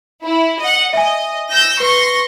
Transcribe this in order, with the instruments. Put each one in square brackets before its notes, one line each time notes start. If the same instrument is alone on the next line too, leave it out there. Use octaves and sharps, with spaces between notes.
[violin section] E4
D#5 F#5
[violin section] D#5 [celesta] E5 G#5
[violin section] E6 G6 A#6
[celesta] B4 [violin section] C6 C#6 A#6